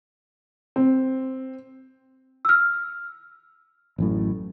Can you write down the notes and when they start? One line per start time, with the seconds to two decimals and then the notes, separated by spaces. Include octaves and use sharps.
0.76 C4
2.45 E6 F6
3.98 A1 F#2 A2